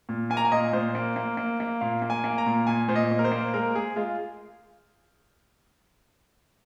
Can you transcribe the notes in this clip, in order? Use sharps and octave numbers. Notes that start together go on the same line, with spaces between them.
A#2
A#3 G#5
A#5
G#5
A#2 D#5
A#2 C5
A#3
A#3
A#3
A#3
A#2 F5
A#3
G#5
A#3
A#5
A#2
A#2 G#5
A#2 C5
D#5
A#2
A#4
C5
A#3
G#3 A#4
G#3 G#4
G#3 F4